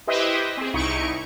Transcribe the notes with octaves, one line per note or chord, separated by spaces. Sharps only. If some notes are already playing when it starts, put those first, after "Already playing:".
E4 G4 B4 C5 D#5 E5
C4 G#4
C2 D#4 E4 C#6 D7